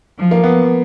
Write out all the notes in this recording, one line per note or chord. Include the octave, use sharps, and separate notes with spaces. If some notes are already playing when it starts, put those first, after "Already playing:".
F3
A#3
B3